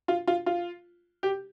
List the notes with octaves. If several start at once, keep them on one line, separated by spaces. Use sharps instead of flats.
F4
F4
F4
G4